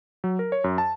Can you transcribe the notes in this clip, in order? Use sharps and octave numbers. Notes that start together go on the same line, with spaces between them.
F#3
A#4
C#5
F#2
A5